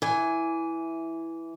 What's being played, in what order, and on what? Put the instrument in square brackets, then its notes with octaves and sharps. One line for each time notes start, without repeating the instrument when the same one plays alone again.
[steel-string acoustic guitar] E3 G#5